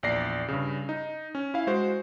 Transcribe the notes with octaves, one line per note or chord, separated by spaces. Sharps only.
A#1 E2 D5 A#6 C7
G2 C#3
D#4
C#4
E4 F5
G#3 F#4 C5